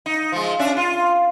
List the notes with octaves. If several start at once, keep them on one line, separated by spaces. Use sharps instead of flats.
D#4
F3 G#3
C#4 D4 E5
F4